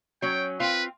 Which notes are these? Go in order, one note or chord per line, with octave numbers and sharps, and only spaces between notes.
F#3 C#4 G5
C4 F4 B4